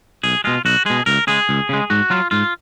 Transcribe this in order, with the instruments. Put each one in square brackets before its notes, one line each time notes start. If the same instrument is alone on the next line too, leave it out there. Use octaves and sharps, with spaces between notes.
[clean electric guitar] B1 G#4
B2 G#3 F4
B1 F#4
B2 G#3 G#4
C#2 A#4
C#3 G#3 G#4
C#2
C#3 G#3
G#2 F#4
F#3 F4
G#2 F4